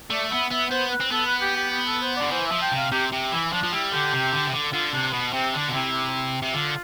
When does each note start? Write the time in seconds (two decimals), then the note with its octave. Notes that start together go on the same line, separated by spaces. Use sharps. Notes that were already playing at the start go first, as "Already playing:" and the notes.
0.10 A3 D5
0.30 B3 E5
0.50 B3 E5
0.70 B3 C5
0.90 B4
1.00 C4
1.11 B3 A4
1.26 B4
1.41 G4
1.56 G4
1.71 G4
1.87 A4
2.02 C5
2.16 D3 D5
2.31 E3 C5
2.46 E5
2.52 F3
2.61 G5
2.72 C3
2.77 F5
2.92 C3 G4
3.12 C3
3.32 E3 E4
3.52 F3 D4
3.63 F3
3.72 G3 E4
3.92 D3 G4
4.13 C3
4.32 D3
4.47 C3
4.53 D3
4.72 D3 F4
4.93 C3 D4
5.12 B2 B3
5.33 C3 C4
5.53 D3 D4
5.68 B2
5.73 C3 E4
6.42 C3
6.53 D3 F4